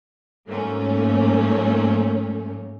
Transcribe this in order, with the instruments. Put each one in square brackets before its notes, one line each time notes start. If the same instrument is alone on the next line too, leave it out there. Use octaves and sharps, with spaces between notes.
[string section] G#2 F#3 A3 A#3 C#4